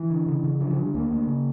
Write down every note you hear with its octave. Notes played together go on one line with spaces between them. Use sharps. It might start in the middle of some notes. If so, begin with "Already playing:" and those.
Already playing: E3
D3
C#3
C#3
D3 F3
F3
D3
G3
D2 A#3
D2
C#3